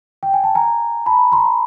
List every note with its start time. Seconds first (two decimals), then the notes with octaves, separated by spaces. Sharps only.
0.23 G5
0.33 G#5
0.44 A5
0.55 G#5 A#5
1.06 A5 B5
1.32 A#5 C6